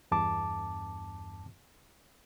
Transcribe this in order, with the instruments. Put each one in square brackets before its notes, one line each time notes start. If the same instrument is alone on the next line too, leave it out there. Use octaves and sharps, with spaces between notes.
[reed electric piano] E2 G2 A5 D6